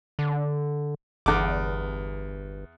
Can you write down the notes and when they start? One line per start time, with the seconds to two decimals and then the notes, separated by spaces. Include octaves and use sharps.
0.19 D3
1.26 G1 E2 D6